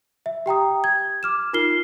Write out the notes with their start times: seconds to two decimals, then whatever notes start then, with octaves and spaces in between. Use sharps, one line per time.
0.26 E5
0.46 G4 G5 A#5 D#6
0.84 G#6
1.23 D6 F6 E7
1.53 D#4 F4 A#4 F6 C7 G7